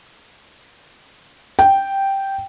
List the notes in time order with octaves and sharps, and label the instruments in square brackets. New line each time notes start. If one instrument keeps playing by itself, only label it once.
[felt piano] G5